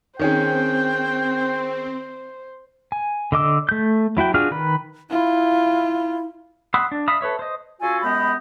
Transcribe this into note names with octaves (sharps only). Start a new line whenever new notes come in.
D#3 C4 C#4 G#4 C5 G5
G#5
D3 D#5 D6 E6
A3 G6
F#3 E4 F#4 G5
D4 F4 F#4 G#4 F6
D#3 B4
E4 F4
F#5 B5 C6 D#6 E6
D4
E5 F5 B5 D#6
A4 B4 C#5 E5
C5 D#5
C#3 F4 F#4 G#4 A4 G#5
F#2 G#3 B3 G4 D#5 B5